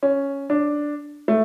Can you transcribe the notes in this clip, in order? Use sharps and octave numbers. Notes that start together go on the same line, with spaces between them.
C#4
D4
A3